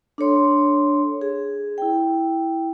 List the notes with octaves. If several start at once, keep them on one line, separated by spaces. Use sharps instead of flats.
D4 A4 C#5 C6
G#4
E4 G5